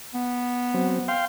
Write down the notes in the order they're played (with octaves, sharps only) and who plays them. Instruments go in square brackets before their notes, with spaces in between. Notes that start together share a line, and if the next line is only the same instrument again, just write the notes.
[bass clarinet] B3
[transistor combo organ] F#3 C4
F5 G5 C6